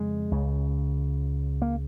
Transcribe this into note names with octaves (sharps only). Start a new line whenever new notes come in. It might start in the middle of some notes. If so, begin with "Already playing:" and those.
Already playing: F2 C#3 G#3
C#2 C#3
A#3